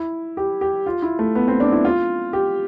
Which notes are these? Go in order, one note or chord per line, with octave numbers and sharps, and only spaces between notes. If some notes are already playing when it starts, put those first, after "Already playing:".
Already playing: E4
G4
G4
F4
E4
A3
B3
C4
D4
E4
F4
G4